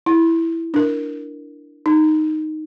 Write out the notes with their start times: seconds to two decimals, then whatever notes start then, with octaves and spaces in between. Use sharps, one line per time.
0.06 E4
0.74 D4 A#4
1.86 D#4